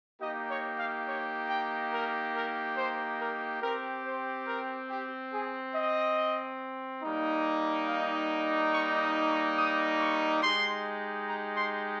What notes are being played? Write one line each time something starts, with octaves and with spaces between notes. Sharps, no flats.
A#3 D#4 G4 D#5
C#5
F5
C#5
G5
A#4
A#4
C5
A#4
C4 G4 A#4
C5
A#4
G4
G#4
D#5
G3 A#3 D#4
F5
C#6
D#6
C#6
D#6
C#6
G#3 D#4 G4 C6
A#5
C6